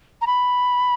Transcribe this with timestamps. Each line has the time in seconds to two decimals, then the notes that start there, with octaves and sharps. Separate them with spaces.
0.22 A#5
0.27 B5